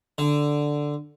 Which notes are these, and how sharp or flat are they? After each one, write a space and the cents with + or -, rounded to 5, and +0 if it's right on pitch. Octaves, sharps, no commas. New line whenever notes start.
D3 +0